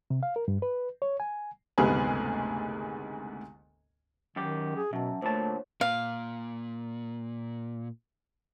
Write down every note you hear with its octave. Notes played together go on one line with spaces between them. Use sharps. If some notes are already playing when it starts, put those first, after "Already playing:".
C3
F5
A#4
G2
B4
C#5
G#5
F#1 D2 G#2 C3 B3 G#4
F#2 D#3 G4
G#4
F#2 B2 E5 A5
D2 A#2 A3 C5 C#5 A5
A#2 F5